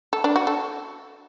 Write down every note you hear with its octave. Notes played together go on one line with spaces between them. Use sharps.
A4
D4
F#4
A4